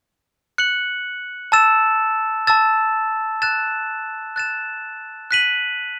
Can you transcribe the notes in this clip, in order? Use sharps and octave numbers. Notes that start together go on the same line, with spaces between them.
F#6 C#7 F#7
A5 E6 A6 E7
A5 E6 A6 E7
F#6 A6 E7
F#6 A6 E7
F#6 B6 D#7 F#7